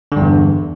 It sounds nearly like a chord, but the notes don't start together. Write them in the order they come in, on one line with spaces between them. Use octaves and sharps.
D3 G2 E2